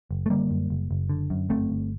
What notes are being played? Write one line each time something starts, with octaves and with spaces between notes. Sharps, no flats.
F#1
A3
D3 G3 A#3
F#2
F#1
F#1
D3
F#2
G1 A3 C4
G1